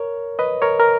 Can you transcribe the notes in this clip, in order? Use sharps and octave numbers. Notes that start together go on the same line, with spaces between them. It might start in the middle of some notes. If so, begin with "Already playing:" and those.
Already playing: A#4 C#5
B4 D#5
A#4 C#5
A#4